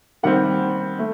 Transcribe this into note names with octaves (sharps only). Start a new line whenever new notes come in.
D#3 G3 C4 F#5
A3